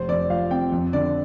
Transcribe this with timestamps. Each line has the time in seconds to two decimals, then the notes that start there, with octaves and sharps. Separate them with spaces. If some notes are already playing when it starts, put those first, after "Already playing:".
Already playing: F1 C5
0.08 F2 D5
0.30 F3 F5
0.51 C4 G5
0.72 F2
0.93 D3 D5